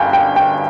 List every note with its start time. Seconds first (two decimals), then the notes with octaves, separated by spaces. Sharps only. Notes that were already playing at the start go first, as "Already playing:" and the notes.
Already playing: G1 G2 G5 G#5
0.13 G5
0.36 G5